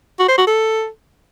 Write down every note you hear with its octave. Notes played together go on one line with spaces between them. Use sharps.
F#4
C5
F#4
A4